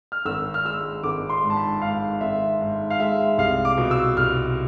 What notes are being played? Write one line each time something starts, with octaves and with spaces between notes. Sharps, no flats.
F6
G#1 E6
F6
G#3 E6
G#1 D6
C6
G#2
A5
B5
G#2 F5
G#1 E5
G#2
F5
G#3 E5
C2 F5
D6
B2
E6
C2 F6